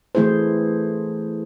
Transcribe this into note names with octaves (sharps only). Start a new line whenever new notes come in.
E3 A3 E4 G#4 C5